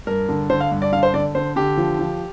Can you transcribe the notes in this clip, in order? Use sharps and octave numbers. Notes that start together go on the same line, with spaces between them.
G2 A#4
D3
D3 C5
F5
G2
D5
D3 F5
C5
D3 D5
D3 C5
D3 G4
F3
F3